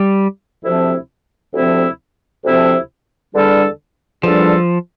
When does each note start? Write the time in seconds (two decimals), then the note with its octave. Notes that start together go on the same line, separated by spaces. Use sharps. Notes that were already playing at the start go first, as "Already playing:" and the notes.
Already playing: G3
0.63 D2 C3 F3 C4 E4
1.54 D2 C3 F3 C4 E4
2.44 D2 C3 F3 C4 E4
3.33 E2 D3 G3 D4 A4
4.23 E2 D3 F3 G3 D4 A4